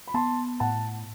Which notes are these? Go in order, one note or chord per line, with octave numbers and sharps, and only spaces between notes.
B5
B3 A5 C6
A2 F#5 A5